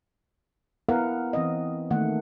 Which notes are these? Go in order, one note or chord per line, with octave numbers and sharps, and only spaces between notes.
B3 E4 A#4 B4 F5 F#5
E3 C4 D#5
D#3 A3 A#3 F#5